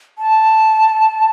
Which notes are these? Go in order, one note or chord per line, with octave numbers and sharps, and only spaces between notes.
A5